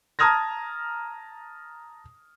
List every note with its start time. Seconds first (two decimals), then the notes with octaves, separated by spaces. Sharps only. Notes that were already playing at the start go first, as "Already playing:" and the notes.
0.19 A5 A#5 D#6 F6 G#6 A#6